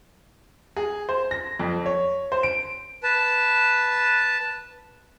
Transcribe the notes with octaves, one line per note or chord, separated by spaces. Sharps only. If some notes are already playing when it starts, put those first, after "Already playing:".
G#4
C5
A#6
F2
C#5
C5
D7
B4 A5